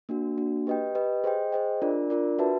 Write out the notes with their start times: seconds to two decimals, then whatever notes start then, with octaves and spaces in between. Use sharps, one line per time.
0.09 A#3 D4 F#4
0.38 A#3 D4 F#4
0.67 G4 B4 D#5 G5
0.95 G4 B4 D#5 G5
1.24 G#4 C5 D#5 G5
1.52 G#4 C5 D#5 G5
1.82 D4 F4 A#4 D5
2.10 D4 F4 A#4 D5
2.39 F#4 B4 E5 A5